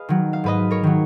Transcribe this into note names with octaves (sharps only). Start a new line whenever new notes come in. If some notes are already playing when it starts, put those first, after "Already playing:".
Already playing: G#4 B4 D#5 F5
D#3 F#3
F5
G#2 B4 D#5
A#4 C#5
D#3 F#3